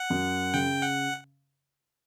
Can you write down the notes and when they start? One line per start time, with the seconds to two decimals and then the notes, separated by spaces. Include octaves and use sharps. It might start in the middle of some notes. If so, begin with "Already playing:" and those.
Already playing: F#5
0.10 F#2
0.54 C#3 G5
0.83 F#5